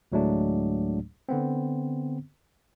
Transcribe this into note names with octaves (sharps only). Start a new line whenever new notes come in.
D2 A2 F#3 G#3 A3 D4
D3 B3 C4